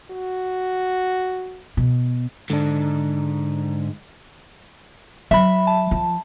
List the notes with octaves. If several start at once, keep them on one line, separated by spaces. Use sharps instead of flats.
F#4
B2
G#2 D3 D4
F#3 E5 B5
A5
F3